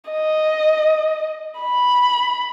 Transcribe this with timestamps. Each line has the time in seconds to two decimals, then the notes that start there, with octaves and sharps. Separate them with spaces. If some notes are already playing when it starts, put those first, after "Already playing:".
0.10 D#5
1.60 B5